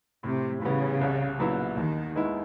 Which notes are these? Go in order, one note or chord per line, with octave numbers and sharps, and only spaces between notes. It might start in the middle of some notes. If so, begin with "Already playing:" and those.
A2 C3
C#3 E3 G3 B3
C2
A#2 F#3 B3 E4
D#2 D#3
D#3 G#3 B3 E4